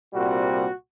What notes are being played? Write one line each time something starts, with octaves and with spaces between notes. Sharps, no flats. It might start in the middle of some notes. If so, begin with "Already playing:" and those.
C2 A#2 G3 C4 F#4